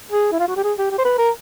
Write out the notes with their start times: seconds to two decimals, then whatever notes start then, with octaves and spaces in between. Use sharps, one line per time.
0.12 G#4
0.32 E4
0.39 F4
0.48 F#4
0.57 G4
0.64 G#4
0.78 G4
0.91 G4
0.98 C5
1.05 B4
1.18 A#4